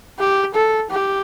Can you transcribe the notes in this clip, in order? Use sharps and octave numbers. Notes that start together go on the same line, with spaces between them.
G4
A4
G4